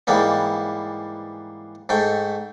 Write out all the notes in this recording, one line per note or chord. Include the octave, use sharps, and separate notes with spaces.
G#2 E3 G3 A#3 B3
G#2 A3 G5